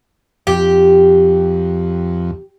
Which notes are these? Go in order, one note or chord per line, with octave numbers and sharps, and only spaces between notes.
F2 G4